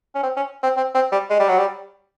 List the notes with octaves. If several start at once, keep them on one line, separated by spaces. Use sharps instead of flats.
C#4
C4
C#4
C4
C4
C4
G3
G#3
G3
F#3
G3